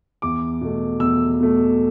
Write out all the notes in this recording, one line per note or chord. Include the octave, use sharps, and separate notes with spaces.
E2 D6
B2 A3
E2 E6
B2 A3